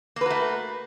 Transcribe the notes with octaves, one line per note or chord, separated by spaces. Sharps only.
A3 A#3 F#4 B4